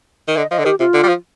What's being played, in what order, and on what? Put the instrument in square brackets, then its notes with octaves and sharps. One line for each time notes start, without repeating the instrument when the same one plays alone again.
[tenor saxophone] D#3
[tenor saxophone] D3 [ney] D#5
[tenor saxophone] F3 [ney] D#5
[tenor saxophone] D3
[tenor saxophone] D#3 [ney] G4
[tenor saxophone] C3 [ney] F4
[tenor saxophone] D3
G3
F3